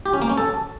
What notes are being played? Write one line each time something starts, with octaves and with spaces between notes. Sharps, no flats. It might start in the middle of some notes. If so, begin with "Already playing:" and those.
G4
C#4
A#3
C#4
A4